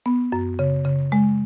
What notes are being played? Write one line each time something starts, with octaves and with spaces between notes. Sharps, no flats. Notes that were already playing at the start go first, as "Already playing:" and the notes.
B3
F#2
C#3
C#3
G#3